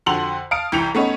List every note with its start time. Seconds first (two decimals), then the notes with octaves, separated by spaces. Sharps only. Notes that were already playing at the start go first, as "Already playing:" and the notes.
0.06 F2 D3 F#4 A5 C6 F#7
0.51 F5 A5 D#6 D7
0.72 C2 E3 G5 C#7 F7
0.95 A3 B3 C#4 D#4